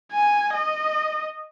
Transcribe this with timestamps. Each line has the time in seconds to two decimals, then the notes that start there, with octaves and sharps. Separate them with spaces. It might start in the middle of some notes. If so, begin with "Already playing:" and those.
0.12 G#5
0.54 D#5